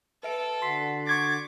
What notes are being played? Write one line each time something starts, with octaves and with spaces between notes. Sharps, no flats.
A4 B4 E5 D7
D3 F#4 C6 B6 C7
C#6 D6 G#6 A6